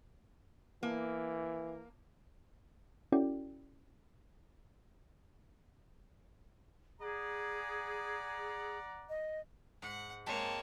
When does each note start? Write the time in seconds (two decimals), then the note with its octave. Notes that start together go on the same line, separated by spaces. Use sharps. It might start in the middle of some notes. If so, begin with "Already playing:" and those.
0.83 E3 A#3
3.12 C#4 E4 F#4 A4 D5 G5
7.01 G#4 D5 F#5 A#5
9.09 D#5
9.82 G#2 F#5
10.26 G#3 A#3 C4 C#5 A5